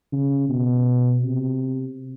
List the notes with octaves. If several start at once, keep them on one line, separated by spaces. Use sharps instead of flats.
C#3
B2
C3